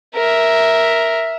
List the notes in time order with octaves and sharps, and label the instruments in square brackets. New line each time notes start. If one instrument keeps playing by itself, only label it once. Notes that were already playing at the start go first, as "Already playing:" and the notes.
[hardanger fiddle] A#4 E5